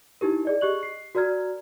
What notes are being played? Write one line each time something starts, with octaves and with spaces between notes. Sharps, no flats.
D#4 E4 G4 A#4
G#4 D5 D#5
G4 D#5 C#6 F#6 F#7
C7
F#4 A#4 D5 A#5 F6 G#6